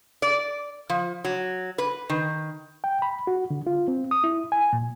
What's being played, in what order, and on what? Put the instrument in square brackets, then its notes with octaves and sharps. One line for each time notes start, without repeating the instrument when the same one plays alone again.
[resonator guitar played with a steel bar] D5
F3
F#3
B4
D#3
[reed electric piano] G5
B5
F#4
D3
F4
C4
D#6
E4
G#5
A#2